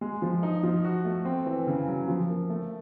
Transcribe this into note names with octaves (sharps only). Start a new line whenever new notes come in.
G#3
F3
D#4
F3
F#4
A3
C4
E3
C#3
F#3
F3
A#3
A3